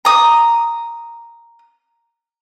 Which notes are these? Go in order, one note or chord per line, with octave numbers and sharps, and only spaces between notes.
A#5 D#6